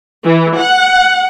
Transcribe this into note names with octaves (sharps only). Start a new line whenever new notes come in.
E3
F#5